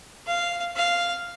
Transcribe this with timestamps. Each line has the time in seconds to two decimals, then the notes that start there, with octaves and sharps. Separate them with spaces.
0.27 F5
0.76 F5